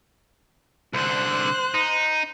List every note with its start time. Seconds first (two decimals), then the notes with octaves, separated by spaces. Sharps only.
0.93 C2 D3 C5 F#6
1.74 D#4